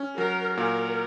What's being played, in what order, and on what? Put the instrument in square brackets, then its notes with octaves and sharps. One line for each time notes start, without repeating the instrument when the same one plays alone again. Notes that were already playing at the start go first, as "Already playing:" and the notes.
Already playing: [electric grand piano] C#4
[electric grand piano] F#3 [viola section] A#4
[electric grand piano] A#2 [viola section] A#4